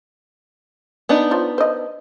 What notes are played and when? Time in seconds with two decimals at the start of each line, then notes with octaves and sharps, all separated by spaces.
1.09 B3 D4 D#4
1.31 F4 C5 C#5
1.58 C5 D#5